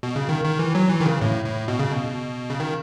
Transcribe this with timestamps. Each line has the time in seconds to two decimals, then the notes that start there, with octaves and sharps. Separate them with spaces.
0.03 B2
0.16 C#3
0.29 D#3
0.45 D#3
0.59 E3
0.75 F#3
0.90 E3
1.01 D#3
1.05 C#3
1.21 A2
1.44 A2
1.68 B2
1.79 C#3
1.92 B2
2.50 C#3
2.60 D#3